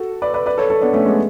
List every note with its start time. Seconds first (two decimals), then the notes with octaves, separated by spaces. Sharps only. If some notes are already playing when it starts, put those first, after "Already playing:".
Already playing: F#4 A4
0.22 B4 D5
0.34 B4 D5
0.46 B4 D5
0.58 A4 C#5
0.70 A4 C#5
0.81 B3 D4
0.94 A3 C#4
1.06 G#3 B3